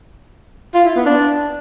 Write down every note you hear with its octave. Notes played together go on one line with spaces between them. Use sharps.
F4
E4
B3
D4